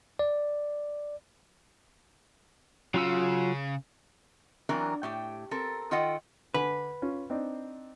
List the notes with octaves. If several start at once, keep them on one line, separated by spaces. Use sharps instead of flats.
D5
C#3 F#3 F4 E6
E3 F#3 C4 D4 A#4
A2 G4 G5
C4 A4 A#4
D#3 F4 A4 D#5 F#5 G5
D3 B4 G#5
C#4 F4
C4 D4 D#4